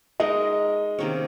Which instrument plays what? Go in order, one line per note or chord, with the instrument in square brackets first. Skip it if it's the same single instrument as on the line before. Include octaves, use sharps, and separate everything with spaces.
[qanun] G#3 D#4 A#4 [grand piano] D#5
[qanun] C3 D#3 A#3 C#4